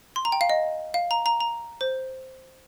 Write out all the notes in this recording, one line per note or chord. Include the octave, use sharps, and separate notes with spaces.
C6
A#5
G5
F5
D#5
F5
A#5
A#5
A#5
C5